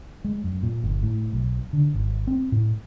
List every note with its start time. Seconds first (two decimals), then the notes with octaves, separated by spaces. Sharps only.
0.24 G#3
0.44 F#2
0.63 A#2
0.83 G1
1.03 A2
1.33 B1
1.73 D3
1.94 G#1
2.27 C4
2.52 A2